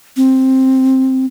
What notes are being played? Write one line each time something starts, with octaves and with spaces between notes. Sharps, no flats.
C4